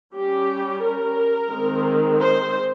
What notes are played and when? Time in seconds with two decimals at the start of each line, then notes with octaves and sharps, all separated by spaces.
0.15 G3 C#4 G4
0.83 A#4
1.51 D#3 G#3 C4
2.19 C5